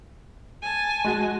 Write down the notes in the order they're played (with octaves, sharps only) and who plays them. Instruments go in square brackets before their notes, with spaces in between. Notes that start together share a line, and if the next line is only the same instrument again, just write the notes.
[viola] G#5 A5
[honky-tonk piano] G#3 F#4